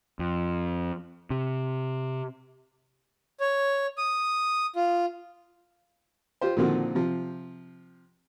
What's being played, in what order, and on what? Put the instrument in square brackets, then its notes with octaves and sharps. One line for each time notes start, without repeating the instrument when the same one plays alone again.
[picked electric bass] F2
C3
[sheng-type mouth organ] C#5
D#6
F4
[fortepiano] F4 G4 C5
A#2 D3 D#3 F3 C4 F#4
C3 F3